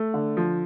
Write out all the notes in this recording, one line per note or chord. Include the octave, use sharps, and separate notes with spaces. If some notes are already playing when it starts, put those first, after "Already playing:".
Already playing: A3
D3
F3